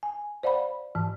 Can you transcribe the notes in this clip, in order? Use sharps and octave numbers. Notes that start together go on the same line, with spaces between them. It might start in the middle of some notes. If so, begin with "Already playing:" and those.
G#5
C5 D5 F5 F#5 B5
G#2 E3